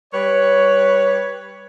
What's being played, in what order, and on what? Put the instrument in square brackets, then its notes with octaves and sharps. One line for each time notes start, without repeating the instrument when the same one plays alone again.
[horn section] G3 B4 C#5